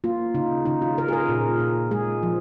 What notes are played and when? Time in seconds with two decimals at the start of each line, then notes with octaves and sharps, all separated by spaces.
0.04 A#3 F4
0.34 C#3 D#4
0.66 C#3 D#4
0.82 F4
0.97 C#3 A#4
1.08 G#4
1.13 A#4
1.29 A#2
1.60 A#2
1.91 G#3 G#4
2.23 F3